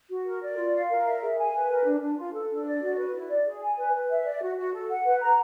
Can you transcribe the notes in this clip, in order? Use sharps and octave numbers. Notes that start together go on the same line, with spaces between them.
F#4
A#4
D5
F4
F5
A#4
E5
G#4
G#5
B4
A#4
D4
D4
F4
A4
D4
D5
F#4
B4
E4
D5
G#4
G#5
B4
B4
E5
D5
F#4
F#4
A4
F#5
B4
A#5